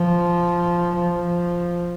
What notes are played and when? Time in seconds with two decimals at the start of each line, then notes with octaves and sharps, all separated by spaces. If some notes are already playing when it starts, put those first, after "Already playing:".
Already playing: F3
0.96 F3